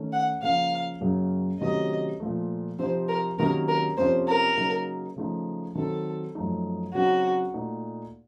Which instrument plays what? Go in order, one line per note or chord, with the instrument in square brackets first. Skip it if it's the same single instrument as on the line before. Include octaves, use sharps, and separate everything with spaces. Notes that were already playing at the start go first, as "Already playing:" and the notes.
Already playing: [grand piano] D#3 A3 C#4
[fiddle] F#5
[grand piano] C#3 F3 A#3 [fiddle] F5
[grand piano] F#2 C#3 F#3 A#3 C#4
[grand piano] C3 D#3 F#3 A3 C#4 [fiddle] D#5
[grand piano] A#2 F3 A3
[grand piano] C3 F3 C4 D#4 [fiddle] C5
[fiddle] A#4
[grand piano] C3 D#3 F#3 A#3 C#4 [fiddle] A#4
[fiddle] A#4
[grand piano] F2 C3 F3 A#3 C#4 [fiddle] C5
[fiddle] A#4
[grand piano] C#3 F#3 A#3 D#4
C#3 F3 A3 D#4
[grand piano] D#3 F#3 C4 D#4 [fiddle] A4
[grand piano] F#2 F3 A3 D#4
[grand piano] C#3 F#3 C4 D#4 [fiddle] F#4
[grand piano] A#2 A3 D#4